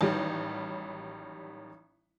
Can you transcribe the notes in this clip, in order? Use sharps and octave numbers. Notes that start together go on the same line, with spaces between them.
A1 D#3 F#3 G3